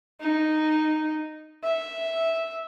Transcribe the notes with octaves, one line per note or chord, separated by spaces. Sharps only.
D#4
E5